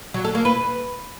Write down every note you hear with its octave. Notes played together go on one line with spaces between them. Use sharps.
F#3
A4
A#3
B4